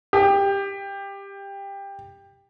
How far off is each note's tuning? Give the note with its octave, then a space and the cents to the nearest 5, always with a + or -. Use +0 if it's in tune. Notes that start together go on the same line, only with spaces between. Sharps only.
G4 +15